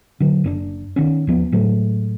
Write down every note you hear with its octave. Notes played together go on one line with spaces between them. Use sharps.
D3 F#3
F#1 C#4 D4
D#3 B3 C#4
D#2 F3 B3
A2 F#3 G#3 A3